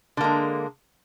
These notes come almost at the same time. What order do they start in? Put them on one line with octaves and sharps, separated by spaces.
D3 A#3 G#3